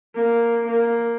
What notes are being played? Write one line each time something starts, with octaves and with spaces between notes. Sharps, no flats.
A#3
A#3